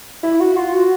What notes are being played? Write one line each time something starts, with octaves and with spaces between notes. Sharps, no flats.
E4
F#4
F4
F#4